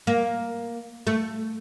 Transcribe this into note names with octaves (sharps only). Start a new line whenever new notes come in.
A#3
A3